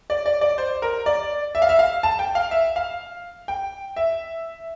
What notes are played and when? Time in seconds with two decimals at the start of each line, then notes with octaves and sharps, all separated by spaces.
0.10 D5
0.26 D5
0.41 D5
0.58 C5
0.82 A#4
1.06 D5
1.55 E5
1.62 F5
1.69 E5
1.79 F5
2.03 A5
2.19 G5
2.35 F5
2.51 E5
2.76 F5
3.48 G5
3.96 E5